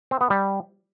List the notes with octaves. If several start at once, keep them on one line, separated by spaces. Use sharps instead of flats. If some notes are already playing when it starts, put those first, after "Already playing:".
C4
B3
G3